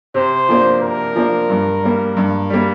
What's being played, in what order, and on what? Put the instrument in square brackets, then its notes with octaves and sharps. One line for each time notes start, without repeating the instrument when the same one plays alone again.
[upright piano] C3 [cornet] C5
[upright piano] F3 A#3 D4
[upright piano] C3 [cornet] A#4
[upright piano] F3 A#3 D4
G2
G3 A#3
G2
G3 A#3